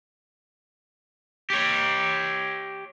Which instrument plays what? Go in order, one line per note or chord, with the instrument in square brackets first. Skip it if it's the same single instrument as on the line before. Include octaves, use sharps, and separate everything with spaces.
[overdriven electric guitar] G4 C#5